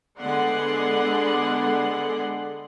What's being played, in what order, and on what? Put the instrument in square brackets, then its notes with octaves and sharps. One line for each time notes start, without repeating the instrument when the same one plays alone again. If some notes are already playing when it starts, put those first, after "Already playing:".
[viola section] D3 G#3 B3 D5 F#5 C6